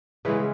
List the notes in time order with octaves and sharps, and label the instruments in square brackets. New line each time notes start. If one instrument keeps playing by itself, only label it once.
[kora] C#3 E3 G#3 B3 B4